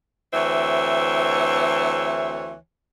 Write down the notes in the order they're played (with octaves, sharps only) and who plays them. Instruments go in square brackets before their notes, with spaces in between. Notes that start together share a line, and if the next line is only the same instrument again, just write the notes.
[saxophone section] D2 E3 C4 C#5 E5